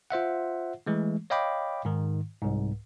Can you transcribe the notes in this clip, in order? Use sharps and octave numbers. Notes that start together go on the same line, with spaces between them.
F4 C5 E5 F#5
E3 G#3 A3
C#5 D#5 F5 G5 B5 D6
G#2 D#3
C2 G#2